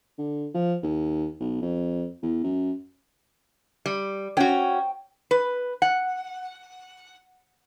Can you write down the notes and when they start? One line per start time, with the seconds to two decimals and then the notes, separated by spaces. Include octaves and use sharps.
0.18 D3
0.54 F3
0.83 D#2
1.40 B1
1.61 F2
2.22 E2
2.43 F#2
3.86 G3
4.37 C#4 F#4 G5
5.31 B4
5.82 F#5